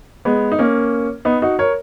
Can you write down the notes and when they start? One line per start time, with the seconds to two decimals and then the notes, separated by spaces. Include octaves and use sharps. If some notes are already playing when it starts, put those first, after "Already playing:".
0.25 G#3 B3
0.52 D#4
0.59 A#3 C#4
1.25 B3 D#4
1.42 D#4 F#4
1.59 A#4 C#5